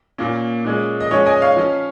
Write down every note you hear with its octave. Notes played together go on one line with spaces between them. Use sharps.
A#2 A#3 C#4
A#2 G#3 C#4
D#5
F3 G#3 C#4 C#5
D#5 G#5
C#5 F5
F3 C#4